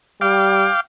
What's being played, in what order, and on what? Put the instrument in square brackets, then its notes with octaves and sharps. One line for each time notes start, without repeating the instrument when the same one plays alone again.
[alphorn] G3 [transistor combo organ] F5 G5 D6